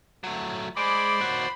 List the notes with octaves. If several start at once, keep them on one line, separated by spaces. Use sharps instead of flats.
F#3 A3
G#3 C5 D5 B5 D6
D#2 F#4